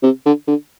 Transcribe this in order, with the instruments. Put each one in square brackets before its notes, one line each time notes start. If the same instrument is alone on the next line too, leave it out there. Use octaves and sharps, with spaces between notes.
[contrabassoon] C3
D3
D3